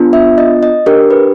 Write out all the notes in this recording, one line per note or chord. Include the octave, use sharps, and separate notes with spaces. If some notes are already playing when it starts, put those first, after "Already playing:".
Already playing: B3 D4 F4
E5
D#5
D#5
D4 G4 A#4
B4